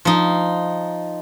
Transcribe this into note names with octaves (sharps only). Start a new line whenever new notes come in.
F3 D#4